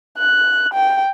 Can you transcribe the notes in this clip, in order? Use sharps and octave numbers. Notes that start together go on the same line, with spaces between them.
F#6
G5